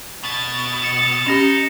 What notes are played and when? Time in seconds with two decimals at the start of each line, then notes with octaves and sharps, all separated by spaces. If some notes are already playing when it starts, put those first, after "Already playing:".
0.23 B2 A6
0.82 C#7 E7
1.27 C#4 D#4 G4 A#6 E7